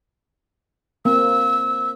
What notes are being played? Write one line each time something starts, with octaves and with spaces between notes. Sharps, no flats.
A#3 C4 E6